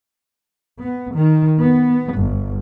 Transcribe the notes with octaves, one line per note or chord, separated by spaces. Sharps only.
B3
D#3
B3
G1